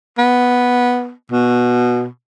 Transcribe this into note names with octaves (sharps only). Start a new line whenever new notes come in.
B3
B2